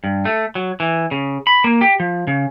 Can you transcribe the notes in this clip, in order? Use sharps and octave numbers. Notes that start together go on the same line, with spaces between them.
G2
A3
F#3
E3
C#3
B5
A#3
G4
F3
C#3